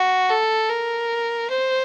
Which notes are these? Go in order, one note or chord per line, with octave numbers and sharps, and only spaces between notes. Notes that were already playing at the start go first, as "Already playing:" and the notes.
Already playing: F#4
A4
A#4
C5